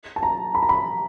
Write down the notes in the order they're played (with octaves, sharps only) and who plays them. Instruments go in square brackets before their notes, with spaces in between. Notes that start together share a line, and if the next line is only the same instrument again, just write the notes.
[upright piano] A5
A#5
B5
A#5
B5